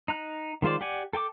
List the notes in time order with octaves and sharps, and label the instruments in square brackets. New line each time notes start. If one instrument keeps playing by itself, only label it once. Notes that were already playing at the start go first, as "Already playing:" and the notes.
[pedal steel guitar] D#4 A#5 F#6
D#3 G#3 F4 C5 D5
G4 D5 F#5 G#5
A4 G5 G#5 D6